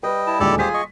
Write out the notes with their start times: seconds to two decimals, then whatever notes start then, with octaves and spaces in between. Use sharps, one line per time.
0.03 G3 B4 D#5 G5
0.27 E4 A5
0.40 D#1 D2 G#3 G4 A4 D5
0.59 F4 G4 G#4 C5 G#5 B6
0.74 D#5 C#6